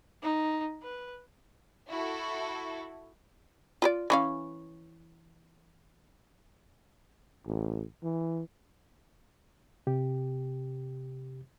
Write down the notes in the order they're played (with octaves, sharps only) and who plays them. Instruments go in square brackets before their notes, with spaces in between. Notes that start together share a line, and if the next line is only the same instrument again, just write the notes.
[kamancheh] D#4
B4
[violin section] E4 F#4 A4
[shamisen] F4 B4 D5
E3 C#4 F5
[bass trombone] A1
E3
[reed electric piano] C3 G4